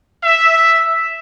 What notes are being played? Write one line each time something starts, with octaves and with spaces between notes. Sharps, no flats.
E5